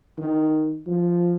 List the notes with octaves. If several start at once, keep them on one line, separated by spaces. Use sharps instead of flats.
D#3
F3